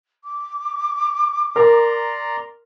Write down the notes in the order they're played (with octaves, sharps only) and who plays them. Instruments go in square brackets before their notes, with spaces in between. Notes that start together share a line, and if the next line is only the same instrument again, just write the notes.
[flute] D6
[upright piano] A#4 [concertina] D5 A#5 C6